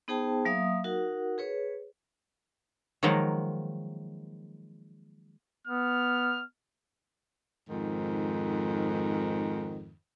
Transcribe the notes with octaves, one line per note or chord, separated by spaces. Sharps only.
B3 D#4 G#4 C5 G5 A5
F#3 A#3 E5 F5 D#6
D#4 F#4 A#4 F#5
G#4 B4 C#5
D#3 F3 F#3 G#3 A#3
B3 F6
F2 G#2 D#3